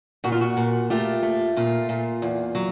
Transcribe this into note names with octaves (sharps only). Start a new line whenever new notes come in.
A#2 F#4
F4
F#4
A#2
A3 F4 G4
A3
A#2 F4
A#2
E2
F#3